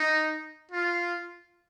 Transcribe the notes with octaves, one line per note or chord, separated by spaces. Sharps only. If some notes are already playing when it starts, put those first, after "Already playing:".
Already playing: D#4
F4